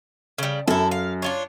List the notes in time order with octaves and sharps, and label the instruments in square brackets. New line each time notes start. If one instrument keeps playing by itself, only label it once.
[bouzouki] C#3 G3
[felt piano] F#2 [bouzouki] E4 A4
[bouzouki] F5
D4 F4 C#5